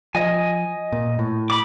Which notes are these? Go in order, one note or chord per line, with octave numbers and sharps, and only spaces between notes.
F3 D#5 G#5
A#2
A2
B5 D6